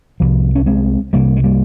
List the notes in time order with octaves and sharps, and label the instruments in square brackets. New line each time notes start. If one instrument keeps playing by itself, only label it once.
[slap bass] C2 C3 F3
C#4
G#3 C4
C2 C3 G3 A#3
G#3
G3 A#3